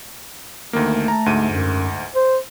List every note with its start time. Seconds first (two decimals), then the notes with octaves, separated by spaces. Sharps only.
0.73 D2 D#3 A3 A#3
1.08 A5 A#5
1.26 D2 G#2 D#7
1.51 F#2
2.15 C5